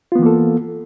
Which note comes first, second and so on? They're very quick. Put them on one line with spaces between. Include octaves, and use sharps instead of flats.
F4 B3 E3 A#3 A4